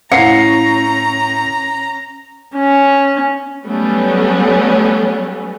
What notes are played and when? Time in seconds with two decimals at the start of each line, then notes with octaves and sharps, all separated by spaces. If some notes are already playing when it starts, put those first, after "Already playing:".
0.12 A2 C#4 F5 F#5 A#5 C7 C#7
2.56 C#4
3.67 F#3 G3 A3 B3 C#4